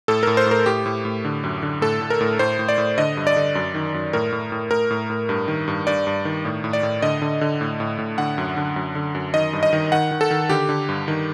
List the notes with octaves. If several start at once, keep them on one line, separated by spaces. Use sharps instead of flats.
A2 A4
A2 A#4
C5
A2 A#4
A2 G4
A2
A2
D3
F#2
D3
A2 A4
A2
A#4
A2
A2 C5
A2
D5
A2
D3 D#5
G2
D5
D3
F#2
D#3
F#2
A2 A#4
A2
A2
A2 A#4
A2
A2
G2
D#3
G2
G2 D5
G2
D#3
A2
A2
D5
A2
D3 D#5
D3
D3
A2
A2
A2
D3 F#5
F#2
D3
F#2
D3
F#2
D#3 D#5
G2
D#5
D#3
D#3 F#5
D#3
A4
D#3
D3 G4
D3
G2
D#3